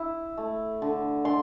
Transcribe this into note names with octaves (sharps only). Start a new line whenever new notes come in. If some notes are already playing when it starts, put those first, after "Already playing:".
Already playing: E4
A3
D3
D3 C6